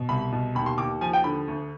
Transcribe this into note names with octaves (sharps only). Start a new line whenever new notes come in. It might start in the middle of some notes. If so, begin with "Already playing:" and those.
Already playing: B2
C2 B5
B2
D#2 B5
C6
D#2 D6
F3 G#5
G5
D3 B5
D2